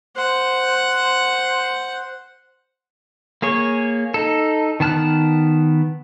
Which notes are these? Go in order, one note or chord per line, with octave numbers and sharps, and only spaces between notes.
C5 F#5
A#3 G#4 C#5
D#4 A4
D#3 B3 A5 F6 F#6